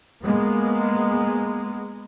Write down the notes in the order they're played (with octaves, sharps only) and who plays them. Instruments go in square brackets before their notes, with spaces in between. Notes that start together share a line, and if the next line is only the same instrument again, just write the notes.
[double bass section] G#3 A#3 B3